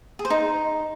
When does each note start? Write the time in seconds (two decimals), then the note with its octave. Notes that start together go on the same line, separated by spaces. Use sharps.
0.19 G#4
0.25 C5
0.30 D#4